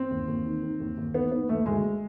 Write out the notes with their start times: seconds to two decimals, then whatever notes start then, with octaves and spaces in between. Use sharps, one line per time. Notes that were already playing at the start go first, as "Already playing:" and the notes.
Already playing: C4
0.11 D#2
0.28 D#2
0.46 D#3
0.62 D#3
0.80 D#2
0.97 D#2
1.14 D#3 B3
1.31 D#3 B3
1.48 D#2 A3
1.66 D2 G#3